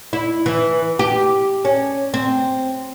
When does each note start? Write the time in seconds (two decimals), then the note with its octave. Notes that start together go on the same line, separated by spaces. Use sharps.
0.13 E4
0.46 E3
0.99 G4
1.65 C#4
2.14 C4